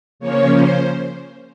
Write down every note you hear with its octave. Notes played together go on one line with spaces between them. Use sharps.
C#3 F3 A#3 C#4 C#5
C5